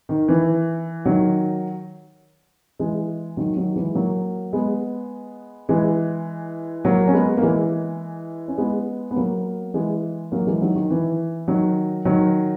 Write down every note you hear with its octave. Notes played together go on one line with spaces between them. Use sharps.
D#3
E3
D#3 F#3
E3 G#3
D#3 F#3
D#3 F#3
E3 G#3
F#3 A#3
G#3 B3
E3 G#3
F#3 A#3
C#4
G#3 B3
A#3
E3 G#3
C#4
G#3 B3
B3
F#3 A#3
E3 G#3
F#3 A#3
E3 G#3
D#3 F#3
D#3
E3
D#3 F#3
D#3 F#3